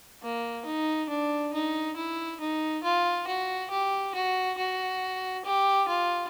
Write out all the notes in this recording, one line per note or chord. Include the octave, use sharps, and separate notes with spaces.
A#3
D#4
D4
D#4
E4
D#4
F4
F#4
G4
F#4
F#4
G4
F4